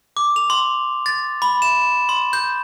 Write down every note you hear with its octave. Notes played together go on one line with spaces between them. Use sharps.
D6
F7
C6
A6
B5
E7
C6
G6